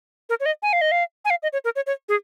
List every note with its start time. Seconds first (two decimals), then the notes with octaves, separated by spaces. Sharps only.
0.29 A#4
0.40 C#5
0.46 D#5
0.62 G#5
0.73 F5
0.81 D#5
0.92 F5
1.25 G#5
1.30 F5
1.43 D#5
1.53 C#5
1.65 A#4
1.76 C#5
1.87 C#5
2.09 G#4